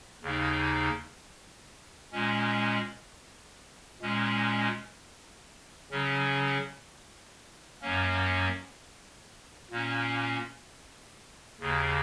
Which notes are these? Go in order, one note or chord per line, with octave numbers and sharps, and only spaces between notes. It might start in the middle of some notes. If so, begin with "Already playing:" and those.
D#2 C#3 A#3 D#4
A#2 G#3 C#4
A#2 G#3 C#4
C#3 F#3 C#4
F#2 F#3 A#3 C#4
A#2 A#3 C#4
D#2 C#3 A#3